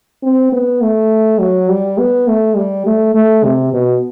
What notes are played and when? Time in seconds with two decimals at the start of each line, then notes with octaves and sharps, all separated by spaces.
0.23 C4
0.52 B3
0.82 A3
1.39 F#3
1.69 G3
1.98 B3
2.28 A3
2.56 G3
2.86 A3
3.15 A3
3.44 C3
3.73 B2